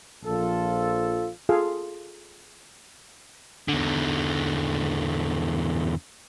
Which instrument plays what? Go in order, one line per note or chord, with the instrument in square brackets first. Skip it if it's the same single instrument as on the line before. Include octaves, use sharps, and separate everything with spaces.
[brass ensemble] A#1 F3 F4 A4
[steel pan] F4 G#4 A4 F5
[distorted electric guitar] E2 D3